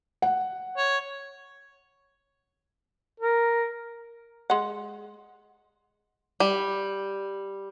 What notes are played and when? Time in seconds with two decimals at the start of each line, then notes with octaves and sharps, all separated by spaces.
0.22 F#5
0.77 C#5
3.20 A#4
4.50 G#3 F#5
6.40 G3